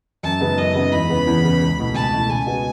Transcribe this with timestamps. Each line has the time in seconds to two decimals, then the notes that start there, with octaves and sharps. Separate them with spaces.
0.23 F#2 A5
0.41 C#3 G#3 B3 D#4
0.58 F#2 D#5
0.75 C#3 G#3 B3 D#4
0.92 E2 B5
1.09 C#3 E3 B3
1.27 E2
1.44 C#3 E3 B3
1.61 C#2
1.78 B2 A3 E4
1.95 C#2 A5
2.12 B2 A3 E4
2.29 C#3 G#5
2.46 G#3 B3 F#4